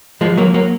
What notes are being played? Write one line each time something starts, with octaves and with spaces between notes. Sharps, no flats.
F3 G#3
F#3 A#3
F#3 A#3